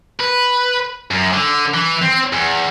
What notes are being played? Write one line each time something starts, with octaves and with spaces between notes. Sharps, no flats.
B4
F#2
D3
E3
C4
E2